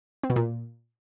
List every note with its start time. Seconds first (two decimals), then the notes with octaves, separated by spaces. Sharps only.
0.23 C4
0.30 B2
0.36 A#2